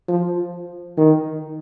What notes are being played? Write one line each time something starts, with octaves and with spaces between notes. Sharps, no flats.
F3
D#3